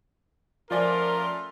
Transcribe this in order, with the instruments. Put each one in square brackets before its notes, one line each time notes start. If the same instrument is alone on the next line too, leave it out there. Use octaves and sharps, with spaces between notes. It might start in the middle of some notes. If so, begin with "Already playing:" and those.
[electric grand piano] F3 D5 G#5 [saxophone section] A3 C#4 F4 [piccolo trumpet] A#4